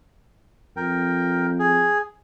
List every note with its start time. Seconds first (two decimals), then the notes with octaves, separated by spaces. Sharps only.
0.77 F2 A#4 G5
1.59 G#4